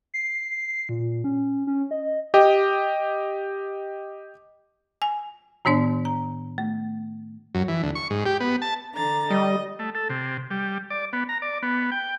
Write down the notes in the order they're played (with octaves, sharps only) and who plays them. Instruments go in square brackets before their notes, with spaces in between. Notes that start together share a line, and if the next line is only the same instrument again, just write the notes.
[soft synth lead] C7
A#2
C#4
C#4
D#5
[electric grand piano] G4 D#5 G5
[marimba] G#5
A2 D#3 B3 D4 D5
A#5
A3
[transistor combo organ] F#2
E3
D2
C#6
G#2
G4
B3
A5
[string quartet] D3 A#5 A6
[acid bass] G3 [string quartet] D#5
[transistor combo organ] A3
A4
C3
G3
D5
B3
A#5
D5
B3
G5